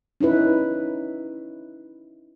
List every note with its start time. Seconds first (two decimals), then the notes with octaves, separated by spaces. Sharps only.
0.21 C#4 D#4 E4 B4